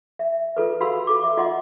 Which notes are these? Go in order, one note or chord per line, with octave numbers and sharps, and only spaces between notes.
E5
F4 A4 B4
F#4 F5 B5 C6 E6
A4 D6
E5 D6
F4 D#5 F#5 C6